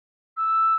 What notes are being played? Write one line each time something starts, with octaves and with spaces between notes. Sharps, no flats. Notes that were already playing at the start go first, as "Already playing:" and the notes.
E6